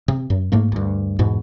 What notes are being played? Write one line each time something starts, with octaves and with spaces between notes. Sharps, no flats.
C3
F#2
G#2 A3 A#3
D2 G2
E2 G#2 B2